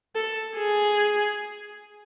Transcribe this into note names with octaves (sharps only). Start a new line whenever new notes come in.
A4
G#4